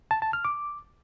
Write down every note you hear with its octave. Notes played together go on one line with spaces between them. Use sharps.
A5
A5
F6
D6